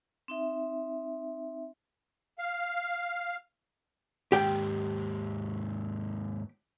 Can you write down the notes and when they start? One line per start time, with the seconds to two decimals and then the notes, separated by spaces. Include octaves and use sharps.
0.28 C4 D#4 E5
2.38 F5
4.32 D#2 G#2 G4 G5